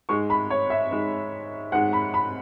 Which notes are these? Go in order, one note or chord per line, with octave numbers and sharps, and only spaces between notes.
G#2 G#3 C#6
B5
C#5
E5
G#2 G#3
G#2 G#3 F#5
B5
B5